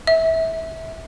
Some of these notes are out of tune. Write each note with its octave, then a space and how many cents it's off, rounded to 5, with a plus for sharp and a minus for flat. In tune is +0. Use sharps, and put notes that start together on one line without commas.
E5 -20